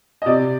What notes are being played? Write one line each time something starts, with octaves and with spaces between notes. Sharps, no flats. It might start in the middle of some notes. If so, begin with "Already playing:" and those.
D#5
C3 D5